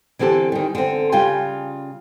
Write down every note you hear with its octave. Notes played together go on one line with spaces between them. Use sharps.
D3 E3 C4 G4 A4
D#3 G3
D3 C4
C#3 G3 F4 G5 G#5